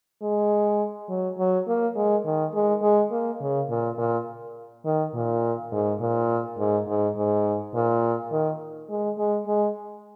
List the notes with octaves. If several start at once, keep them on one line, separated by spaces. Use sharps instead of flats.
G#3
F#3
F#3
A#3
G#3
D#3
G#3
G#3
A#3
C#3
A#2
A#2
D#3
A#2
G#2
A#2
G#2
G#2
G#2
A#2
D#3
G#3
G#3
G#3